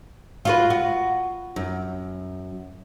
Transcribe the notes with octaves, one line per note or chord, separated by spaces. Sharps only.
F4 F#4 B4
F#4
F#2